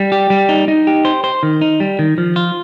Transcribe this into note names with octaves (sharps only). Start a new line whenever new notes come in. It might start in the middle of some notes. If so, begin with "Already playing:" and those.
Already playing: G3
G4
G3
D#4
D#4
G4
C5
C5
D#3
D#4
G3
D#3
F3
F4